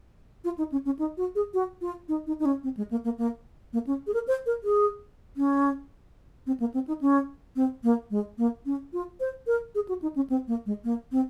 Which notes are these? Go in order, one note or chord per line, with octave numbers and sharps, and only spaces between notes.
F4
D#4
C#4
C#4
D#4
F#4
G#4
F#4
F4
D#4
D#4
D#4
C#4
C4
G#3
A#3
A#3
A#3
A#3
C#4
G#4
A#4
C5
A#4
G#4
C#4
C4
A#3
C4
D#4
C#4
C4
A#3
G#3
A#3
C#4
F4
C5
A#4
G#4
F#4
D#4
C#4
C4
A#3
G#3
A#3
C4